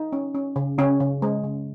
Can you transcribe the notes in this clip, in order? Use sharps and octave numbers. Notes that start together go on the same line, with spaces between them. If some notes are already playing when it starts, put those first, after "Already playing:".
Already playing: D#4
C#4
C#4
C#3
C#3 C#4
C#3
G#3
C#3